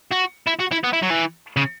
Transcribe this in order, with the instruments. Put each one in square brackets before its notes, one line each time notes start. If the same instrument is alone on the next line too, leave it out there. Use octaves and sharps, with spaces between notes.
[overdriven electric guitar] F#4
E4
F#4
E4
B3
E4
F#3
E3
C#3